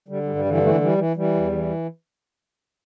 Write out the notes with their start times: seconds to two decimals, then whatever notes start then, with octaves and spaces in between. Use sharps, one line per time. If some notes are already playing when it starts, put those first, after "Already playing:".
0.08 D3 G3
0.23 G3
0.27 G2
0.36 G3
0.45 D3 E3
0.58 G3
0.62 E3 A3
0.74 A3
0.81 E3 G3
0.98 E3
1.16 E3 G3
1.34 E2
1.52 E3